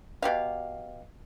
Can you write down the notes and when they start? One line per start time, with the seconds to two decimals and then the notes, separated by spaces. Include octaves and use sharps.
0.22 B2 G4 F5